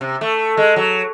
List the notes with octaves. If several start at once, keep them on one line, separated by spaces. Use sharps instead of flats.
C3
A3
G#3
F#3